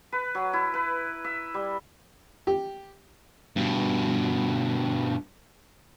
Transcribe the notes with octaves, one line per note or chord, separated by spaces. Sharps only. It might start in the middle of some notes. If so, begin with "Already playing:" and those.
B4
F#3
E4
B4
E5
G3
G4
G2 B2